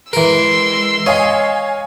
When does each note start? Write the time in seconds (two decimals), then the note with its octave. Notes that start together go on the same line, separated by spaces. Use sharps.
0.13 E3 G#3 A#4 C6 E6
1.06 C#5 D#5 F5 G#5